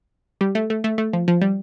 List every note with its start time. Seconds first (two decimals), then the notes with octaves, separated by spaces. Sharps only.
0.41 G3
0.55 A3
0.70 A3
0.84 A3
0.98 A3
1.13 F3
1.28 F3
1.41 G3